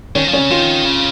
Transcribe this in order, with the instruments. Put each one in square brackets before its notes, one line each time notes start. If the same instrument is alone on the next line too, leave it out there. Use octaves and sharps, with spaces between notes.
[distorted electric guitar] D#3 [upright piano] C#4
[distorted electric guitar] F3
[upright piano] C#4
[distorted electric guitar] C#3
[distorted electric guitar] D#3 [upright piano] F4
[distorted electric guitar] C#3